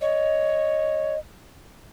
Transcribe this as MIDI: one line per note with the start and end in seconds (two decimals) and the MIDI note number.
0.01 1.15 73
0.01 1.19 75